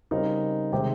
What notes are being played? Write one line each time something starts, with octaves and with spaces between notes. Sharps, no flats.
C#3 G3 C4 D#4 A#4
C3 D#3 G#3 C4 G4